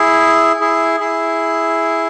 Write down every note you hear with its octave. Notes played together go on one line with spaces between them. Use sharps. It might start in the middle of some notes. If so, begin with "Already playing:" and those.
Already playing: E4 G#4
E4 G#4
E4 G#4